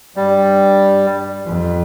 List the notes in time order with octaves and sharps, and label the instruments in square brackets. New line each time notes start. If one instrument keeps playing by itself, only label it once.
[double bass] G2 [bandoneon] G3
[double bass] F2